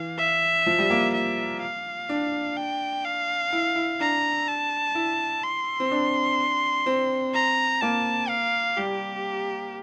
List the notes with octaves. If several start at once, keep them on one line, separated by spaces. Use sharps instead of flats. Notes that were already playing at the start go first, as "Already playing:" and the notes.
Already playing: E3 F5
E5
F3
G3
A#3
E5
F5
D4
G5
F5
E4
E4
D4 A#5
A5
E4
C6
C4
D4
C4
A#5
A#3 A5
F5
G3 G4